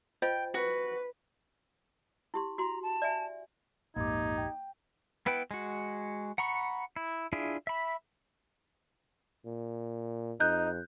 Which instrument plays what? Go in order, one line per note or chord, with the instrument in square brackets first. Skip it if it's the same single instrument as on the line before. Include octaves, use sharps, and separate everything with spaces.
[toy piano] F4 C5 D#5 [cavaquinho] G5
[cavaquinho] F#4 [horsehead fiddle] B4
[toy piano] E4 G4 C6
[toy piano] F#4 C6 [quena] A#5
[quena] A5
[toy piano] D5 E5 G#5
[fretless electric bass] A#1 F2 G#2 [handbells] A#3 D6 [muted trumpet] D#4 [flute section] G4 G#6
[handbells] G5
[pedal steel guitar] B3 E4 B4 G5
G#3 F#4
F#5 A#5 B5 C#6
E4
D4 E4 F4 G#4 E5
E5 B5
[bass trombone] A#2
[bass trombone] F2 [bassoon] D#4 [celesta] F#6 G6